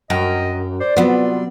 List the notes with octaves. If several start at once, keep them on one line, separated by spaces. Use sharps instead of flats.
F#2 D#5 G5 A#5
C5 D5
C3 F#3 G3 B3 F4